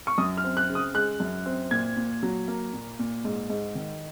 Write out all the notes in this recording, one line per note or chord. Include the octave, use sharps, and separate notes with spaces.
C#6
F#2 D#6
F6
C4
F#6
C#3
D#6
G#3 F#6
F#2
C4
A#2 G#6
A#2
F#3
A#3
A#2
A#2
G#2
G#2
D#3